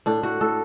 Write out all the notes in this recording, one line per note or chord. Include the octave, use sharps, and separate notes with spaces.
A2 D4
A2 F#4
A2 A4